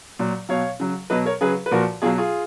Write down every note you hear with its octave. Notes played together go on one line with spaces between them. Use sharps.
A#2 F#3
B2 F#3 C#5 F5
C#3 F#3
B2 F#3 B4 D#5
A#4 C#5
C#3 F#3 G#4 B4
B4
A#2 F3 F#4 A#4
B2 F#3 F4 G#4
F4 G#4